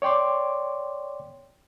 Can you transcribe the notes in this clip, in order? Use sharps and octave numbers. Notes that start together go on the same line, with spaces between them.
C#5 D5 G5 C6 D6